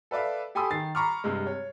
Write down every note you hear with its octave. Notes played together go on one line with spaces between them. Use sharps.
A4 B4 D5 E5 F5
G4 A4 G#5 B5 C6 D#6
D#3 A6 C7
A#5 B5 C#6 D6 F6
G2 C3 G#3
C#5